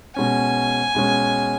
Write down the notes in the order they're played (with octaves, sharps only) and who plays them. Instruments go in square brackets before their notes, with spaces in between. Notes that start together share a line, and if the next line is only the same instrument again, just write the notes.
[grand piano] B2 G#3 C#4 [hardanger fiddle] G#5
[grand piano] B2 G#3 C#4